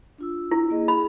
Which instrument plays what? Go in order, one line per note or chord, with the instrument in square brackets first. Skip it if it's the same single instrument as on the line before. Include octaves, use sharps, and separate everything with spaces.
[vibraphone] D4 F4 E6
[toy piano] E4
[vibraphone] A#3 G#4 D#5
[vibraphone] G#4 [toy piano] B5